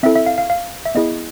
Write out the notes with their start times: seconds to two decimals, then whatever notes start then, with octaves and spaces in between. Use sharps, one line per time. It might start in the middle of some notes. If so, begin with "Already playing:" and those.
0.03 C4 E4 A4 E5
0.15 E5
0.26 F5
0.38 F5
0.50 F5
0.86 E5
0.95 B3 E4 G#4 D#5